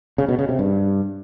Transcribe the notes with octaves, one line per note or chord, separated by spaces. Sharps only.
C#3
B2
C#3
C3
G2